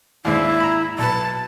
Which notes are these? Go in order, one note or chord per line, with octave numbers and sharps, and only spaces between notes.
D#2 G#2 D4 E4
A#5 B5
B1 B4 A5